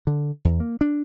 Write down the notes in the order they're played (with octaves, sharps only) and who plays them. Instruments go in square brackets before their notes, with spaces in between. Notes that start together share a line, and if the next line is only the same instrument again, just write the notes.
[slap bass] D3
E2
A#3
D4